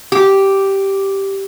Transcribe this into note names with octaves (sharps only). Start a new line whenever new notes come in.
G4